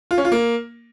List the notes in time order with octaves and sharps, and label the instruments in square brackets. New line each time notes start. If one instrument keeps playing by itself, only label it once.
[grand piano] F4
C#4
F4
A#3